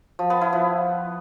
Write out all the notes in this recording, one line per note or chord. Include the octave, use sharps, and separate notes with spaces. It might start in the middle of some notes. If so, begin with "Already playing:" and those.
F3
B3
E4
F3